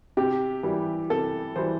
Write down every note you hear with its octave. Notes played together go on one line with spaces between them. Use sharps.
C3 G4
E3 G3
C3 A4
E3 G3 C5